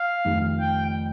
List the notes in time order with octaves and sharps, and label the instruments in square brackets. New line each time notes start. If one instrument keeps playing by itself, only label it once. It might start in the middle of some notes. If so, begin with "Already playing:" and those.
Already playing: [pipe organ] F5
[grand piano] F1 F2 D#3 G3
[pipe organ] G5